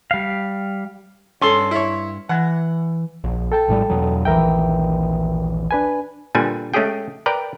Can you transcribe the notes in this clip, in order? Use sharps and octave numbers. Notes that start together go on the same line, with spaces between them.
G3 F5
G2 C#4 A4 C6
E4 C#5
E3 F#5
A#1
A4 G5 A5
A#1 A2 G3
E2 B2 F#3
A#1 D#2 E3 A#4 E5 G5
D4 B4 G#5
A#2 D3 G3 B4 G#5
G#3 A3 C#4 G4 G#4 G5
A#4 B4 D5 G5